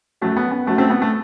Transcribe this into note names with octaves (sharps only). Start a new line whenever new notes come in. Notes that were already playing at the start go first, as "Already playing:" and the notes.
F#2 F#3 A3
B3
B3
F#2 F#3 A3
A3 C4
B3
A3